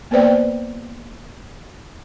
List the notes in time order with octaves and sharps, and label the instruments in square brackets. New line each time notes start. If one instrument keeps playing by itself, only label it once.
[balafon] A#3 B3 B4 C5 D5 G5